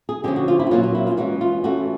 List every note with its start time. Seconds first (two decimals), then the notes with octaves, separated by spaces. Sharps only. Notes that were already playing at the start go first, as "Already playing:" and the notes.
0.09 G#4
0.24 D3 F3 A3 C#4 G4
0.36 F#4
0.48 F4
0.59 E4
0.67 F#4
0.71 A#2 F#3 A#3 C#4 F4
0.83 F4
0.95 E4
1.07 F4
1.17 E3 G#3 C#4 F#4
1.41 F4
1.64 E3 A3 C#4 F#4